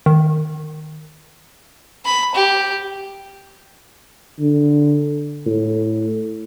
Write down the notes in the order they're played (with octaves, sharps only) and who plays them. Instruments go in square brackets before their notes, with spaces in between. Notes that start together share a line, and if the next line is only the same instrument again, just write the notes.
[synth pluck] D#3
[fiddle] B5
G4
[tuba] D3
A2